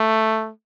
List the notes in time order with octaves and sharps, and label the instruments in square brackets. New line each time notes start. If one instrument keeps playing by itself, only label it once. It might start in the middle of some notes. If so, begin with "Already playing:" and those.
Already playing: [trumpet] A3